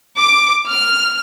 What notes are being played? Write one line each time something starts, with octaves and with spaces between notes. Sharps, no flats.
D6
F6